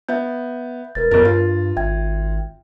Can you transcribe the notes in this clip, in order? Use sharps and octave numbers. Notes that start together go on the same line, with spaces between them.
B3 E5 G6
E1 A#4 B4 A6
G1 F2 A#4 A6
G2 F4
G#1 E5 G5 G#6